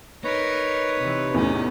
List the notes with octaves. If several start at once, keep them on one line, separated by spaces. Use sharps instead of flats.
D#4 A#4 B4 C#5
C3 E3
E2 A2 C#4